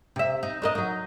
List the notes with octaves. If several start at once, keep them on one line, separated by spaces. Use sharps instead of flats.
C3 E5
D#4
D4 A#4 D#5
F#3 D#4